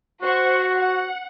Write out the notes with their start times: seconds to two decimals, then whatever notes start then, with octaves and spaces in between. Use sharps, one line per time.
0.22 F#4 C5 F#5 C#6
0.78 F#5